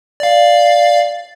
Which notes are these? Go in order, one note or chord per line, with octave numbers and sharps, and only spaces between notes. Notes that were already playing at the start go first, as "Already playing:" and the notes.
D5 F5